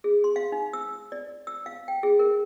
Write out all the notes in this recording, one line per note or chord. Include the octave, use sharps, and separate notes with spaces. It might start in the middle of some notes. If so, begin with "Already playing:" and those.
G#4
C6
F5
D#4
E6
D5
E6
F5
G5
G#4
A#4